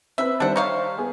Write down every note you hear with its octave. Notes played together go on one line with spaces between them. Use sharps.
C4 B4 E5
D#3 G3 D4 C5 F#5
D#4 C#5 F5
B3 G#4